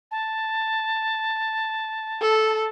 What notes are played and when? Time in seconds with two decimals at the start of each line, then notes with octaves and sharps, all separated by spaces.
0.11 A5
2.21 A4